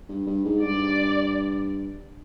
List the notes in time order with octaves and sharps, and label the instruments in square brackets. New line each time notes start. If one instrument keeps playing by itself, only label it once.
[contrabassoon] G2
G2
G#2
[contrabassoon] G2 [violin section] D5